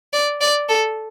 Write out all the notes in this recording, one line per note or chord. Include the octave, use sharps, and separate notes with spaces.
D5
D5
A4